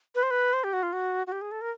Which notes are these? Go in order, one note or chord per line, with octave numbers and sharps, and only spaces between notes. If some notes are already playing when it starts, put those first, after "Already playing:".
B4
C5
B4
C5
G4
F#4
F4
F#4
F#4
G4
G#4
A4
A#4